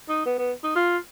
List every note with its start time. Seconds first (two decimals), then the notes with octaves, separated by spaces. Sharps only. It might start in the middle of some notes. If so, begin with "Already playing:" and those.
0.09 D#4
0.26 B3
0.38 B3
0.64 D#4
0.76 F4